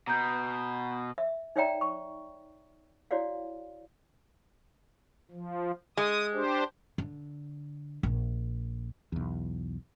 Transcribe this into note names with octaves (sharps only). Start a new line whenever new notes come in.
B2 A#5 G6
E5
D#4 C#5 D5 E5 G5 A#5
C#6
E4 F#4 C#5 D5 F5
F3
G#3 D#6
D4 G4 C5
D3
A#1
B1 E2